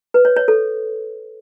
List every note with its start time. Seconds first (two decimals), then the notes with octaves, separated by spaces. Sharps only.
0.14 B4
0.25 C#5
0.36 C#5
0.48 A4